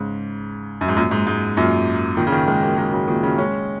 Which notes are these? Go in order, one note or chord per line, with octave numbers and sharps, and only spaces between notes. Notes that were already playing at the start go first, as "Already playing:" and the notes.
Already playing: G#2 C#3
F#2
G#2
F#2 A#2
G#2
G#2
F#2 A#2
A#2 D#3
C#3
A#2 D#3
D#3 G#3
F#3 A#3
D#3 G#3
C#3 F#3
A#2 D#3
C#3 F#3
G#3 C#4